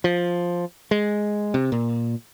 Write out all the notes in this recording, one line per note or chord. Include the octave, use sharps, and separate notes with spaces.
F3
G#3
C3
A#2